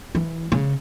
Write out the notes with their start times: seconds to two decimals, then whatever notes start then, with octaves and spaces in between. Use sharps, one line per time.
0.15 E3
0.52 C#3